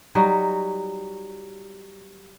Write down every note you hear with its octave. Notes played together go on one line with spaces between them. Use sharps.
F#3 G3 D#4 F#4